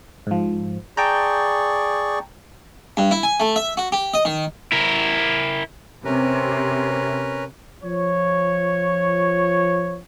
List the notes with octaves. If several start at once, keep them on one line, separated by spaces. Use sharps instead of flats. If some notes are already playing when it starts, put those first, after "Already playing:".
G#2 F3
G#4 D5 G5 A5 A#5 C#6 G6
G2
E4
G#5
A3
E5
F#4
G4
D#5
D#3
E4 A#4
C3 C#4 A#4 B4
F3 C#5